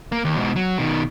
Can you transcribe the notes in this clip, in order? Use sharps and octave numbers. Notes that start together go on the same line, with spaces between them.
A#3
D#2
G#2 B2
F#3
B2 D#3